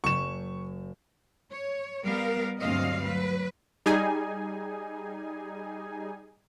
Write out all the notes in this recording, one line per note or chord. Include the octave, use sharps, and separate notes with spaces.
F#1 C#6 G6 E7
C#5
G3 B3 A#4 F5
D2 G2 F#3 C4 D#5 F5
F#3 B4
G3 D#4 G#4 G#5